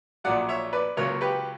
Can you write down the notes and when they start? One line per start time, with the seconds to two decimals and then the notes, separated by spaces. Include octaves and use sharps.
0.24 A#1 A#2 F#3 D5 F#5
0.49 C#5 E5
0.73 B4 D5
0.97 C#2 C#3 F#3 A#3 A#4 C#5
1.21 G4 B4